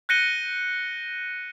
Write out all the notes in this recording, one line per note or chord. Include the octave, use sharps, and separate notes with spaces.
F#6 G6 A#6 C#7 D#7 G7